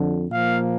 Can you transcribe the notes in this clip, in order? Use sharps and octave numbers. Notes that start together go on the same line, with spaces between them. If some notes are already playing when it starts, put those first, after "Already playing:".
Already playing: F2 D3 F3
A#2 F3 A#3 F5